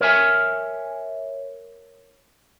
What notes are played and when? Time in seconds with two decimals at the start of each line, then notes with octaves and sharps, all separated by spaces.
0.01 A#4 C#5 E5 G#5